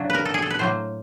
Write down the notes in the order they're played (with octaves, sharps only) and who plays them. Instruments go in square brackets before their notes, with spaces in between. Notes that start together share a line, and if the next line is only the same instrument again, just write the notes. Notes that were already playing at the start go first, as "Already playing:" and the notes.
Already playing: [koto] C#3 F#3 D4
A#4 B4
A4
G#4
A4
B4
A2 F#3 A#3 C5